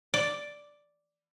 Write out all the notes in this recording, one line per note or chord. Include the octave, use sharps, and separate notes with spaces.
D5